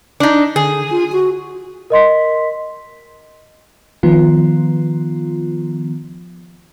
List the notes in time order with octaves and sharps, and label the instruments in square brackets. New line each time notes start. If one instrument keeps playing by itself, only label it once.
[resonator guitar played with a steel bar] D4 D#4
[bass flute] D3 [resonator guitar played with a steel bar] G#4
[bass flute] F4
F#4
[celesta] A#4 D#5 C6 B6
[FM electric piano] D#3 F3 B3 F4